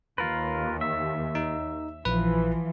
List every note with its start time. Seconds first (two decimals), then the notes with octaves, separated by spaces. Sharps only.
0.18 D#2 F4 A#4 B4
0.81 E5
1.35 D#4
2.05 A#1 E3 F3 B4